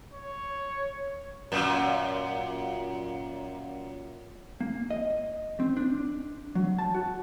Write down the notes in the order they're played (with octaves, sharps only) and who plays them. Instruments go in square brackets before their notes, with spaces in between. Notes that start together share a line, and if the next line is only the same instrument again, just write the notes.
[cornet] C#5
[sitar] F#2 A#2
[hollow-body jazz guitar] A#3
D#5
C4
D4
F#3
A5
F#4